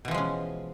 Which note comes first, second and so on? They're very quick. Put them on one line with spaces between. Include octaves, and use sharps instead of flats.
B2 E3 F3 G#3 C#4